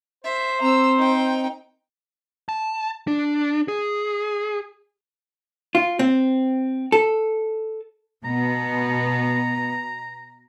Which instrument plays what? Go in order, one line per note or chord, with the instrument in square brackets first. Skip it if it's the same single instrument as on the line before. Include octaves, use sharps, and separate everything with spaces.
[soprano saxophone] C5 [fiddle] E5
[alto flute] C4 [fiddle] A#5 E6
[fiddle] D#4 G5
[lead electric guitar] A5
D4
G#4
[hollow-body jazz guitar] F4
C4
A4
[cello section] B2 B3 [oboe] A#5